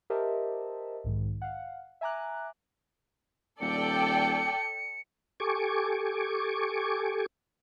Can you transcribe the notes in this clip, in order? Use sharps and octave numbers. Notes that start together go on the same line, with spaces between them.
G4 A#4 C5 D#5 E5 A5
B1 G#2 D#3
F5 F#5
E5 G#5 A#5 D6 F#6
D#1 A4 D5 G5 C#7
G4 A4 G#5 C#6 D6